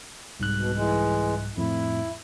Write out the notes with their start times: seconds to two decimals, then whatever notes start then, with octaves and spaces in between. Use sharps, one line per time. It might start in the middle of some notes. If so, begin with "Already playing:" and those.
0.40 C2 G#2 F#6
0.56 B2
0.76 E3 G#3
1.57 F2 A2 E4